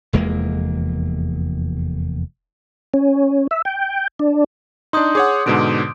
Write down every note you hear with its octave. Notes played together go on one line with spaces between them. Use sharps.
F1 E2 G#3 A#3
C#4
E5
G5
D4
D4 D#4 C6 D#6 G6
G#4 C#5 F#5 D6 D#6
G#2 B2 D3 D#6 D7